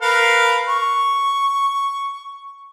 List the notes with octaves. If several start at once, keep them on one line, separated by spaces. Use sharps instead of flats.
A#4 B4 F5
C#6